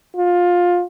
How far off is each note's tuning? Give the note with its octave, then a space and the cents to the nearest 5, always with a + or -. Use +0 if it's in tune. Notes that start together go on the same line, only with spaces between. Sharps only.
F4 +20